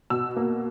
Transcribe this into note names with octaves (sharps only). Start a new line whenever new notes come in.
B2 E6
A#3